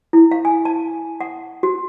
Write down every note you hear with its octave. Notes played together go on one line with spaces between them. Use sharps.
E4
F5
G#5
A5
F#5
F#4